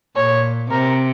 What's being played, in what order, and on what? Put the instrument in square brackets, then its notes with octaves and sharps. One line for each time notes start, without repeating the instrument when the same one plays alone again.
[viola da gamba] A#2 [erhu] C#5
[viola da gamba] C3 [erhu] A#4